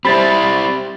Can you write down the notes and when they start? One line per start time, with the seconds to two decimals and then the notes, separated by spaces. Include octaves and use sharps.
0.05 G3 C4 E4 C5 B5 A6